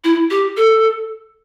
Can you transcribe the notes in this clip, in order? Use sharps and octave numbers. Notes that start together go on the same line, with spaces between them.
E4
G4
A4